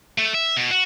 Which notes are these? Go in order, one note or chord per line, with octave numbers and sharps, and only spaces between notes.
A3
E5
B2
F#4